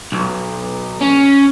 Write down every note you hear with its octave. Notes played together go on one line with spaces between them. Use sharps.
B1
C#4